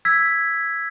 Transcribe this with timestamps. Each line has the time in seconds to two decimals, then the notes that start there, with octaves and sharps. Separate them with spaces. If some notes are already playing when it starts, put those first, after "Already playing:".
0.05 E6 G#6 B6